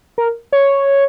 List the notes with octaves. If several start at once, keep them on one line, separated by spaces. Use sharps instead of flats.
A#4
C#5